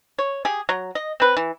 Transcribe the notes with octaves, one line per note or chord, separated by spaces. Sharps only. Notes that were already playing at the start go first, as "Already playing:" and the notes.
C#5
G4 G#4
F#3 A#5
D#5
C4 B4
E3